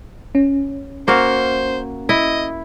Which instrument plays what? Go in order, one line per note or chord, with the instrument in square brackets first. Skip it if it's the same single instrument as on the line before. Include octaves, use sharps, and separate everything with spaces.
[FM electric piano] C#4
[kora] A#3 F#4 F5 [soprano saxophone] C5
[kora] E4 [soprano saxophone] D#5